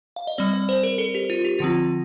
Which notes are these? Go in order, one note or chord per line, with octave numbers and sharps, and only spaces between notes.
F5
D#5
G3 C4 D5
D5
C5
A#4
A4
G4
F4
G4
D3 F3 C4 F4